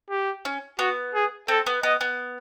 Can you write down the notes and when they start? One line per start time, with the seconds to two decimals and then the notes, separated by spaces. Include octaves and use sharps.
0.10 G4
0.45 C#4
0.79 B3 F#4
1.15 G#4
1.48 C4 A4
1.67 B3
1.83 B3 D#5
2.01 B3